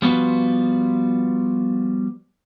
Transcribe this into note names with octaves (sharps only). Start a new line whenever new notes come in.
F3 G3 B3 F4 F#4 B4